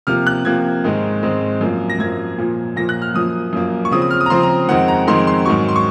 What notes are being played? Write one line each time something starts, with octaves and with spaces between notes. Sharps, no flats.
C3 F3 A#3 F6
F#6
C3 F3 A#3 G#6
G#2 D#3 G#3 C4
G#2 D#3 G#3 C4
F#2 F3 A#3
A#6
F#2 F3 A#3 G#6
A#2 F3 A#3
A#2 F3 A#3 A#6
F#6
F6
F#2 F3 A#3 D#6
F#2 F3 A#3
C#6
C#3 F3 C4 D#6
D#6
F6
D#6
A#5
C#3 F3 C4 C6
A#5
F2 D#3 G#3 C4 F#5
A#5
F2 D#3 G#3 C4 C6
C6
G#2 D#3 F#3 C#6
C6
C#6